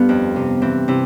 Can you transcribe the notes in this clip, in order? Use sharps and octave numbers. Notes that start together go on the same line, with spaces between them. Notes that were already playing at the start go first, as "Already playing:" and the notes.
Already playing: G2 B3 F4 A4
F2
C3
E3 C4
C3 E4